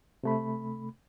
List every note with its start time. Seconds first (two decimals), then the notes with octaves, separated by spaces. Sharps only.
0.24 C3 A3 B5